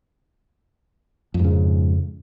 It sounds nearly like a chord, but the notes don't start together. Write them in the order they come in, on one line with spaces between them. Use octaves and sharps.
F2 G#2 C#3